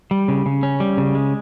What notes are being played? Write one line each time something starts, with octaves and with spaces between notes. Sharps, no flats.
G3
C#3
C#3
C#4
G3
C#3
G#3